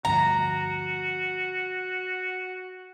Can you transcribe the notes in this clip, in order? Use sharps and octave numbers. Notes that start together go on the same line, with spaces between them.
D2 G2 F3 F#4 A#5